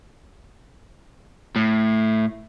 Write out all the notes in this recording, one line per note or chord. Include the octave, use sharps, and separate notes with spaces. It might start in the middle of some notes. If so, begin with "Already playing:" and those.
A2